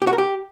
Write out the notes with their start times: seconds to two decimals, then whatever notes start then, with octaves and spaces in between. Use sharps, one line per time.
0.02 G4
0.07 F#4
0.13 A#4
0.18 G4